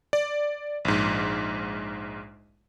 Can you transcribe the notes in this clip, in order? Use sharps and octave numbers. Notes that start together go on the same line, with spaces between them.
D5
A#1 G#2